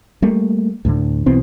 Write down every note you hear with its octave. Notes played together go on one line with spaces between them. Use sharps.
G3 A3 A#3
D2 A2 D3
B1 B2 E3 C4